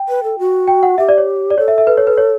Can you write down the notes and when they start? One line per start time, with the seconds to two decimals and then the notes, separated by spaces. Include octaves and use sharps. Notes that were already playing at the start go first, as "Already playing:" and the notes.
Already playing: G5
0.09 B4
0.23 A4
0.39 F#4
0.68 G5
0.83 F#5
0.98 G4 E5
1.09 D5
1.18 C#5
1.50 D5
1.58 A4 C#5
1.68 E5
1.78 E5
1.87 B4
1.97 C#5
2.07 B4
2.18 C#5